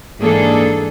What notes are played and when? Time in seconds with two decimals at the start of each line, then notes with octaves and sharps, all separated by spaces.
0.21 G#2 E3 A#3 D4 G#4 A4